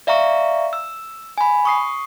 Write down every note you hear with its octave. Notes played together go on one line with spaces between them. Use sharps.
D5 E5 F5 A#5 C#6
E6
G#5 B5
C#6 D#6 C7